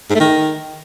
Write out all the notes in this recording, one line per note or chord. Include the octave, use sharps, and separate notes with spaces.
G#2
A3
D#3